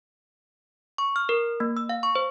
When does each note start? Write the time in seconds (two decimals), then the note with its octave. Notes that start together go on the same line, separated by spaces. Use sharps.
0.98 C#6
1.16 F6
1.29 A#4
1.60 A#3
1.77 E6
1.89 F5
2.03 C#6
2.15 C5